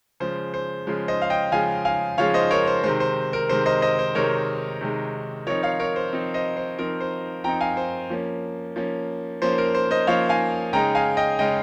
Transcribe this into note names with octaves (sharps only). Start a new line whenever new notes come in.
C#3 F3 G#3 C5
C5
C#3 F3 G#3
C5 D#5
F5
D#5 G5
C#3 F3 G#3 F5 G#5
F5 G#5
C#3 F3 G#3 C#5 F5
C5 D#5
A#4 C#5
C5
C3 D#3 G#3 C5
C5
A#4
C3 D#3 G#3 C5
C5 D#5
C5 D#5
C5
C3 D#3 G#3 A#4 C#5
C3 D#3 G#3
F3 C4 D#4 A#4 C#5
C#5 F5
A#4 C#5
C5
F3 C4 D#4
C5 D#5
C5
F3 C4 D#4 A#4
C5
F3 C4 D#4 G5 A#5
F5 G#5
C5
F3 A#3 C#4
F3 A#3 C#4
F3 A#3 C#4 C5
A#4
C5
C5 D#5
F3 A#3 C#4 C#5 F5
F5 G#5
C#3 G#3 D#4 G5 A#5
F5 G#5
D#5 G5
C#3 G#3 D#4 D#5 G5